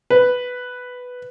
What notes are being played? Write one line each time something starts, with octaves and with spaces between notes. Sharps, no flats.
B4